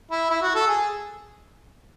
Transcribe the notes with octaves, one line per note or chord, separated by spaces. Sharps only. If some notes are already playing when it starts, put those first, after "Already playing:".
E4
E4
F#4
A4
G#4